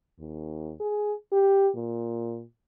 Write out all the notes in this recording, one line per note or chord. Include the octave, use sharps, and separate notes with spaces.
D#2
G#4
G4
A#2